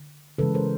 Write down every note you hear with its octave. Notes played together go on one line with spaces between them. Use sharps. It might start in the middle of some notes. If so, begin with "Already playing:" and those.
Already playing: D3
C#3 E3 G#3 A4 B4
A#4 C5